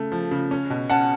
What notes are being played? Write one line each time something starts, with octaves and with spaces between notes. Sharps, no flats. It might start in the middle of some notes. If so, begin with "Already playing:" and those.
Already playing: C#3 A3
F3
C#3
C#4
B2
C#4 F#5 A5